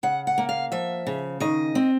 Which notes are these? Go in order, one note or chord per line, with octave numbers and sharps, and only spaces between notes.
C#3 F#5
F#5
A#3
F5
F3 E5
C#3
D#3 D#5
C4